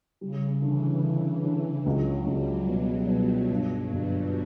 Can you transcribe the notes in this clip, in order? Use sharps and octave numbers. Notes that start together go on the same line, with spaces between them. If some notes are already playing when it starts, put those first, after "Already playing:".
C#3 G3
D3 E3
D3 E3
D3
C#2 F#3
C#2 G3
B2 G3
B2
G2 F#3
G1 G3